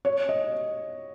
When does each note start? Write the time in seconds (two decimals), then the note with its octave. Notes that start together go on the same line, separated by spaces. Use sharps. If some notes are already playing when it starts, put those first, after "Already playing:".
0.05 C#5
0.29 D#5